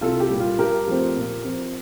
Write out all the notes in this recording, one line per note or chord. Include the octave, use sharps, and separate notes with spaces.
C2 F4 A4
G4
A#2 G3
F4
G2 G4 A#4
F3 A3 C4
A#2
F3 C4